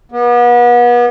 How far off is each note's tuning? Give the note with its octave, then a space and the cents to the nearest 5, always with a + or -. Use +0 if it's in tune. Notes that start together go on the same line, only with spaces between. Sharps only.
B3 -35